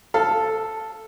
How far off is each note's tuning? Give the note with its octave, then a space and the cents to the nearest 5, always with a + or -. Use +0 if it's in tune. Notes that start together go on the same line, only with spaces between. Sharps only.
A4 +0 F5 +0